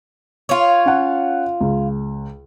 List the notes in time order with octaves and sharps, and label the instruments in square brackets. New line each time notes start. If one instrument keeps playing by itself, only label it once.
[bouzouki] F4 C#5
[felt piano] C#4 F#5
C#2